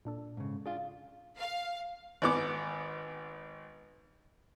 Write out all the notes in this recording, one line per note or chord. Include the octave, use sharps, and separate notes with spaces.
A#2 D4 A4
G#2 C#3
D4 F4 G#4 F5
F5
G#1 B3 D6